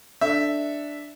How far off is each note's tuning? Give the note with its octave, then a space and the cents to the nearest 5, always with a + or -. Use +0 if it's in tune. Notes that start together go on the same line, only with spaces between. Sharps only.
D4 +0 A4 +0 E5 -5